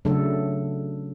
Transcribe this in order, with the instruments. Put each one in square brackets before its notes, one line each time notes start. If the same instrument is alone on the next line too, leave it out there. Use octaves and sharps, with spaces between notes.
[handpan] C#3 F#3 A3 D4 A4